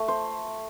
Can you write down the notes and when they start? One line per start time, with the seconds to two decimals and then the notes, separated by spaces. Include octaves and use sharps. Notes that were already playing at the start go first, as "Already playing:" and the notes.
Already playing: A3
0.08 C5